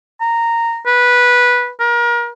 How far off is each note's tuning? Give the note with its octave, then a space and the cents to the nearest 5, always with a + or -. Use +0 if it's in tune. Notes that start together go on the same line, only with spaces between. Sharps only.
A#5 -10
B4 -10
A#4 +30